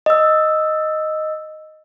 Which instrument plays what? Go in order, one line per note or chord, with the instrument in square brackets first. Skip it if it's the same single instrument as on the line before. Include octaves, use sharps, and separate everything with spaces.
[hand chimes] D#5 E6